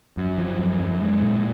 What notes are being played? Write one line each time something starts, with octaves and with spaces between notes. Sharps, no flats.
F#2
F3
F#2
F#2
G#3
A#2